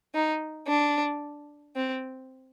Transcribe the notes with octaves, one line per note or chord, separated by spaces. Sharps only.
D#4
D4
C4